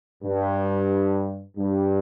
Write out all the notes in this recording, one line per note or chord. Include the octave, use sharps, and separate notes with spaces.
G2
G2